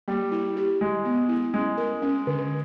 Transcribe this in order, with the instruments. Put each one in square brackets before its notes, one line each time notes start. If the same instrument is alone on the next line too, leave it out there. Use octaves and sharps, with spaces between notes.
[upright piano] G3 [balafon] A#3
[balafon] E4
G4
[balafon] D#3 [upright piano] G#3
[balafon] B3
E4
[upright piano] G#3 [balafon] C#4
[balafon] A#4
C#4
D3